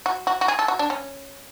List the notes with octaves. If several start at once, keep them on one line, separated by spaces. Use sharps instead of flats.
F#4
F#4
F#4
G#4
A4
F#4
D4
C#4